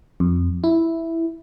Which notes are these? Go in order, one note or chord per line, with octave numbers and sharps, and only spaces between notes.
F2
E4